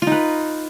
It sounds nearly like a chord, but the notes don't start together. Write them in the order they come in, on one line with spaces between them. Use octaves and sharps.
F4 D#4 B4